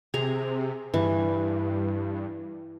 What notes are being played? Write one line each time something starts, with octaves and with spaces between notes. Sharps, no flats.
C3 G#4 A#5
G2 E3